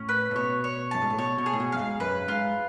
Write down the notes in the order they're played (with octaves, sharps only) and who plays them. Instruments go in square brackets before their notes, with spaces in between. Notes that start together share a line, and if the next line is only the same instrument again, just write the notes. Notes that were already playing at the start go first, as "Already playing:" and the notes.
Already playing: [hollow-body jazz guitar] A2 [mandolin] C#4
[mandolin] B4
[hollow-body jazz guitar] A2
[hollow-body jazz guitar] B2 [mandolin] C#5
[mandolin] C#5
[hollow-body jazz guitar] F#2 [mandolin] A5
[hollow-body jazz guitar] G#2
A2
[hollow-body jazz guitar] B2 [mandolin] C#5
[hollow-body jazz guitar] B2
[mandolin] G#4
[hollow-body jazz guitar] A2
B2
[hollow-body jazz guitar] F#2 [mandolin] F5
[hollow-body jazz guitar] G#2
[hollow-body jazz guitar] F#2 [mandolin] B4
[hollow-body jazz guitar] G#2 [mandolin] F4